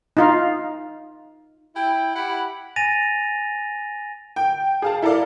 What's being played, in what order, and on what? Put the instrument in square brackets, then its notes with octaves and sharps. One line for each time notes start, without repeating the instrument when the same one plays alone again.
[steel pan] D#4 F4 F5
[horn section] E4 G5
E4 G4 F#5 B5
[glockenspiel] G#5 A6 A#6 D#7 F7
[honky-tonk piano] G5
G#4 F5 A5
E4 A4 A#4 D5 F5